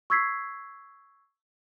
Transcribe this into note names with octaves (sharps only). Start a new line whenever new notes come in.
C#6 E6 G#6 B6 C7